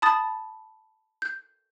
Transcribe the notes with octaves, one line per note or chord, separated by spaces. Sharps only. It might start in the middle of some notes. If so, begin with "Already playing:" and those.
A5 B5 D#6 A6
G6